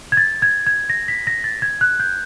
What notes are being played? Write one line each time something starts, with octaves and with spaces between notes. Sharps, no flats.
G#6
A6
G#6
G#6
A#6
B6
A#6
A6
G#6
F#6
G6